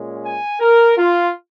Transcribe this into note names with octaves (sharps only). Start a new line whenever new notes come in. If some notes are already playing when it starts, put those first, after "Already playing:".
Already playing: A#2 G#3 C#4
G#5
A#4
F4